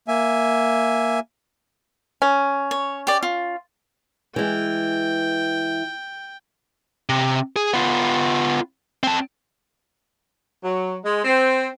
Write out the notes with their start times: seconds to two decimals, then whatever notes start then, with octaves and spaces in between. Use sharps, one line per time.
0.08 A#3 E5 G#5
2.22 C#4
2.71 C#5
3.07 G4 D5
3.23 F4
4.36 E3 G#3 G5
7.09 C3
7.56 G#4
7.74 B3 F4
9.03 C4 A5
10.63 F#3
11.03 G#3
11.24 C4